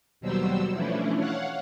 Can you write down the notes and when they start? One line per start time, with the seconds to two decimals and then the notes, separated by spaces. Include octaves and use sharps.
0.20 D#2 B2 F#3 G3 C5 E6
0.72 E3 F3 A3 C#4 D4 E4
1.15 C#5 F5 F#5